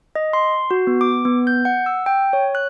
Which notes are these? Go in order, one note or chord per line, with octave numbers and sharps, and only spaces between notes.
D#5
C6
F#4
B3
D6
B3
G6
F#5
E6
G5
C#5
F#6